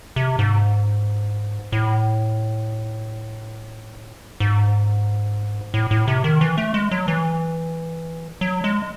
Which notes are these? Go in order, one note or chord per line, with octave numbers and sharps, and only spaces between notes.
C3
G#2
A2
G#2
A2
A2
C3
D#3
E3
A3
G#3
F#3
E3
F#3
G#3